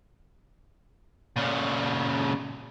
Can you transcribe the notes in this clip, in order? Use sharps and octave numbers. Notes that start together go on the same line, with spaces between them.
A#2 C#3